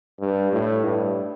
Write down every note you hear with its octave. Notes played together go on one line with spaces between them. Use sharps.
G2
A2
G2